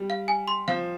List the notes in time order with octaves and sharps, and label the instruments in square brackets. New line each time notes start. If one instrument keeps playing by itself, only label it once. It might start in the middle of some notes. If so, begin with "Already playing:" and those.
Already playing: [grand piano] G3
[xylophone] F5
G#5
C6
[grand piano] F3 [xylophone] F5